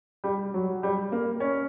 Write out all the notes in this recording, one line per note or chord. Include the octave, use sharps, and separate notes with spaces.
G3
F#3
G3
A#3
C#4